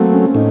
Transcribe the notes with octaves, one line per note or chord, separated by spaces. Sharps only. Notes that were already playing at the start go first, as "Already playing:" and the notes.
Already playing: F#3 A3 A#3 C4
C#4
A2 D#4